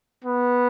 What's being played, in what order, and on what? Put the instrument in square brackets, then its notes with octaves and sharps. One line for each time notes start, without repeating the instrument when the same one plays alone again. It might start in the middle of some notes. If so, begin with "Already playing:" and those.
[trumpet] B3